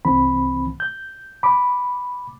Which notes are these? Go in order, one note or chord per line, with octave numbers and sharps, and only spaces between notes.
C2 E3 C4 B5
G6
B5 D6